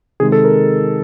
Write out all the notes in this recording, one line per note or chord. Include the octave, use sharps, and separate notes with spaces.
C3 D#3 G#3 G#4
A4
A#4